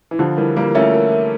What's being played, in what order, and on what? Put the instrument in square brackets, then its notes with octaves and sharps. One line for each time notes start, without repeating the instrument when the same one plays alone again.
[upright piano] E3
[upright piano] D3 F3 [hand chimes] F4
[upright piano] E3 G3 [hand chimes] A#4
[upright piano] G3 A#3 [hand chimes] F4
[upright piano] A3 C#4 [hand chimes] E5
[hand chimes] A#4
A#4